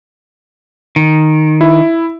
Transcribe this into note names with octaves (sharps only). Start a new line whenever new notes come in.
D#3
E4